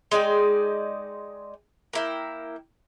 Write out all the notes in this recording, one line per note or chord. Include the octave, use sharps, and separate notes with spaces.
G#3 D#4 D5 G5
A#3 E4 G5